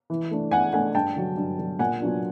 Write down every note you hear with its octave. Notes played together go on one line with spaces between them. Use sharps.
E3
A3 D4
E3 F#5 G#5
A3 D4 F#5 G#5
G2 G5 A5
D3 F#3
G2
D3 F#3
A#2 F#5 G#5
F#3 B3 D4 F4